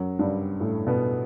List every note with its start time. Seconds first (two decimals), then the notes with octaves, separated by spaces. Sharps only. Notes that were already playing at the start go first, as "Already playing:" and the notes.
Already playing: F#2 F#3
0.19 G2 G3
0.60 A2 A3
0.87 B2 B3